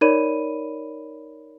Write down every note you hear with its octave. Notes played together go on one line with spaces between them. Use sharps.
D#4 A#4 C#5 D5 B5 D#7